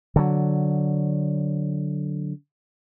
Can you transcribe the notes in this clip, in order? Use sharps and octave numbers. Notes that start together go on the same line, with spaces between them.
D3 F#3